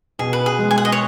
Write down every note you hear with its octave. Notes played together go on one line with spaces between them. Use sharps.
B2 G#4
B4
G#4
G#3
G#5
F#5
D#5
C#5